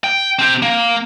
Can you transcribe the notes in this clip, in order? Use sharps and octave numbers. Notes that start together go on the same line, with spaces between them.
G5
C4 G4
A#3